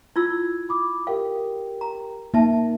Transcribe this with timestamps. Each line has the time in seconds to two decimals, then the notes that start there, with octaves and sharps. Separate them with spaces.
0.16 E4 F4 E6 G#6
0.69 B5 D6 D#6
1.07 G4 A#4 F5 G5
1.81 A#5
2.34 A#3 D#4 E5 A5